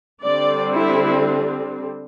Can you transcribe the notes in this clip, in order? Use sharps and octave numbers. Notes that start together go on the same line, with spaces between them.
D3 G3 C4 D5
E4